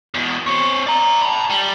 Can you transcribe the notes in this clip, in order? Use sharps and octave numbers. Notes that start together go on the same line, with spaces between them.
E2 B2
C4 C#5
D5 A#5
A5 B5
G3